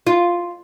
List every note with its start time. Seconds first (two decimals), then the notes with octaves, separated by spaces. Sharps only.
0.07 F4